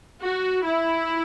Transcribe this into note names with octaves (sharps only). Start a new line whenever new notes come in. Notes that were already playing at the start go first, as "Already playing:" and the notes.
F#4
E4